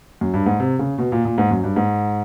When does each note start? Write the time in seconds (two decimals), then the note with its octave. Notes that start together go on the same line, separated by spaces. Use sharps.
0.21 F#2
0.34 G2
0.46 G#2
0.60 C3
0.79 C#3
0.98 B2
1.12 A#2
1.25 A#2
1.38 G#2
1.51 F#2
1.64 G2
1.76 G#2